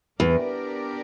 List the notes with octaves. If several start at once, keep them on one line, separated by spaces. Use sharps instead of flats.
E2 B3 D4 G4 A#4 D5